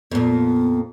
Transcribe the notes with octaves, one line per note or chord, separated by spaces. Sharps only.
F2 A#2 B3